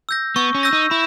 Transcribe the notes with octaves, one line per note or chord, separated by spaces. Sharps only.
E6 G6 A#6
B3 C#6
C#4
E6 G6 A#6
D#4
E4 B5